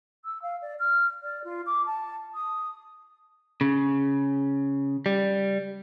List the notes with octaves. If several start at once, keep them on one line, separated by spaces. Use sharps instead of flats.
E6
F5
D5
F6
D5
F4
D6
A5
D#6
C#3
G3